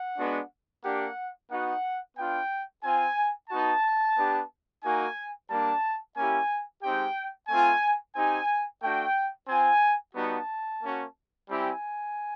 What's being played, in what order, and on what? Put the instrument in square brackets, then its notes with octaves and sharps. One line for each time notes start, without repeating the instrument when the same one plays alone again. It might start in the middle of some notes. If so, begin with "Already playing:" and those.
Already playing: [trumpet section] F#5
G#3 B3 D4 F#4
A#3 D4 G4 F#5
B3 D#4 F#4 F#5
B3 D4 F4 G5
C4 F4 G#5
B3 D#4 F#4 A5
B3 D4 G4
A#3 D#4 F#4 G#5
G3 A#3 D4 A5
A#3 C#4 E4 G4 G#5
G#3 C4 D#4 G4 G5
A3 C4 F4 G#5
C4 D#4 G4 G#5
A3 D4 F#4 G5
C4 F4 G#5
G3 B3 D#4 F#4 A5
A#3 C#4 F#4
G3 C4 E4 G4 G#5